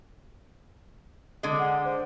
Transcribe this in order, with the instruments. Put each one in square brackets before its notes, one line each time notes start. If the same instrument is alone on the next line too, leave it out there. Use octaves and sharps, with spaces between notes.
[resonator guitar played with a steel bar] D3 G#3
[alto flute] F#5
C5